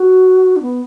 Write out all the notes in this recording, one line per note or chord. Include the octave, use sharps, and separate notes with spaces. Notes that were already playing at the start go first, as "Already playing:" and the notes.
Already playing: F#4
D4
B3